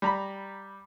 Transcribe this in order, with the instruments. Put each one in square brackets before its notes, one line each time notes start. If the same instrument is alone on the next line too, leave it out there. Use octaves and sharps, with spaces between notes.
[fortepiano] G3 A#5 B5